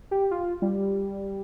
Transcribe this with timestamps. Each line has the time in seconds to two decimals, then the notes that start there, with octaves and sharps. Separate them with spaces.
0.11 G4
0.31 F4
0.62 G3